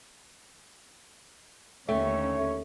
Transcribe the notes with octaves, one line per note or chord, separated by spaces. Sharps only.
D#2 D3 A3 C#4 C#5 E5 G5